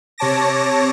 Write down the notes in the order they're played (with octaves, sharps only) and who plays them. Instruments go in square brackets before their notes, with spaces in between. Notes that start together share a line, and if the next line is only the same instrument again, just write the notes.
[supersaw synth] C3 C#5 A5 D6 A#6